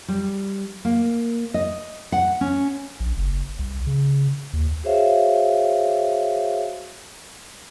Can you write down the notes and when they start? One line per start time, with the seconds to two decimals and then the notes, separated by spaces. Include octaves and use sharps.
0.08 G3
0.85 A#3
1.54 D#5
2.12 F#5
2.41 C#4
3.00 A#1
3.16 F#1
3.59 C2
3.87 C#3
4.53 D#2
4.83 F#4 G#4 C5 C#5 E5 F5